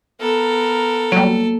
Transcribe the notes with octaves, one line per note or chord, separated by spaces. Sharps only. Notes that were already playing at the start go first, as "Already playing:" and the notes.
B3 A4 A#4
F#3 G3 A#3